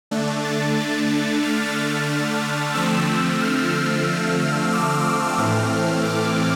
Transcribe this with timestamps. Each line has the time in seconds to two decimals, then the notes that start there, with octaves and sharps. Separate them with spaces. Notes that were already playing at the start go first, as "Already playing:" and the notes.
0.11 D3 A3 D4
0.44 A6
0.77 A6
1.43 F6
2.74 D3 F3 A3 C4 E6
3.07 E6
3.40 F6
3.73 F6
4.39 E6
4.72 D6
5.05 F6
5.38 A2 E3 A3 C4
6.03 D6